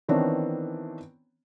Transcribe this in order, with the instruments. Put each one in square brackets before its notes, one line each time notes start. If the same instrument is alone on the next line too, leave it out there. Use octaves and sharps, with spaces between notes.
[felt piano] D#3 E3 B3 C4 D4 C#5